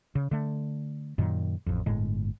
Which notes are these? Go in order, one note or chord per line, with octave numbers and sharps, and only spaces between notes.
C#3
D3 A3
F#2 A#2 D#3
A1 F2
G1 A2 G#3